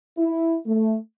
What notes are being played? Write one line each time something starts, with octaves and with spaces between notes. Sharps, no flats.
E4
A3